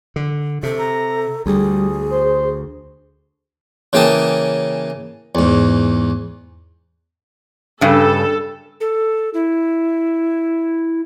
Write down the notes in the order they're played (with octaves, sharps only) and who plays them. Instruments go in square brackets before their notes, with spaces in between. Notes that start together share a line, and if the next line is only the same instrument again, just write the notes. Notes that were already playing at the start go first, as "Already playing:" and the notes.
[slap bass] D3
[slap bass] C3 [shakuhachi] A4
[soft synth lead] A#5
[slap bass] D2 [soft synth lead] G3 [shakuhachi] G#4
[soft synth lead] C5
[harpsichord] C#3 E3 A#3 G5 A5 D#6
E2 G#2
[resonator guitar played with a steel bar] G2 C#3 [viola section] A4
[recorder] A4
E4